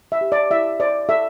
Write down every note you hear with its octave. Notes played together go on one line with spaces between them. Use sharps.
E5
G4
D5
E4 E5
C5 D5
A4 E5